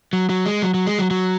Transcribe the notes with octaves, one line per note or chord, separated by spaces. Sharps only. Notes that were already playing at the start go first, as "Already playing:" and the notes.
F#3
F#3
G#3
F#3
F#3
G#3
F#3
F#3